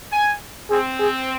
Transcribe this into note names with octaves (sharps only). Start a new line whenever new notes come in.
G#5
C4 G#4
G#4